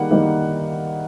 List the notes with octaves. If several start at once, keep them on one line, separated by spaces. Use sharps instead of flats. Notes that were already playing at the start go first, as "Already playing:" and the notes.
Already playing: D#3 G3 A#3 D#4 F#5
D#3 G3 A#3 D#4